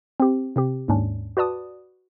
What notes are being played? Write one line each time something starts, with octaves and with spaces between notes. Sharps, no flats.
C4 G4
C3 C4 G4
D#2 G#2 C#4 D4
F#4 B4 D5 A5 D#6